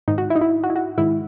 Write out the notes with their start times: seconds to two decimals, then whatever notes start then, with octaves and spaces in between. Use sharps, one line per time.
0.08 G#2 D#3 D#4
0.18 F#4
0.30 E4
0.36 D#4
0.41 E4
0.64 F#4
0.70 E4
0.76 F#4
0.98 G#2 D#3 E4